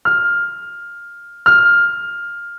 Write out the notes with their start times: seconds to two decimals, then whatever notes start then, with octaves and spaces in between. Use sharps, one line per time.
0.05 F6
1.46 F6